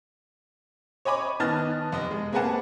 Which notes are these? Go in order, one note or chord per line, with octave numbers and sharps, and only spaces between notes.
C#5 D#5 G#5 B5 D6
D#3 B3 D#5 A5 F6 A6
F1 D#5
G#3
A#3 C4 G#4 B4 F#5 A5